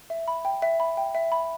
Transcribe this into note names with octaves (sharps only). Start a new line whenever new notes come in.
E5
B5
G5
E5
B5
G5
E5
B5